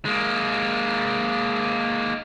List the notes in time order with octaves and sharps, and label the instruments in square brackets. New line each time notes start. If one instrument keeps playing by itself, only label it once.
[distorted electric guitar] G#3 A#3